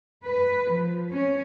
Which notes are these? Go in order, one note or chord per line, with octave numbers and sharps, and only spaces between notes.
B4
F3
C#4